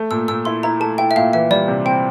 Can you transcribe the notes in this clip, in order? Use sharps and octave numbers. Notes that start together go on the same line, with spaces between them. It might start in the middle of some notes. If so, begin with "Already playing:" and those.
Already playing: A3
A#2 E6
A#2 E6
E4 C6
E4 A#5
A3 A5
E4 G5
E5
A#2 F5
E3 E5
G3 D5
C3
C4 G5